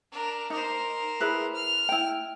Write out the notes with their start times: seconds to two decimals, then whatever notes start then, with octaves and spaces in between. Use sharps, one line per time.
0.12 D4 A#4
0.50 D#4 A#4 C5
1.20 E4 G#4 B4
1.54 F6
1.89 E4 G5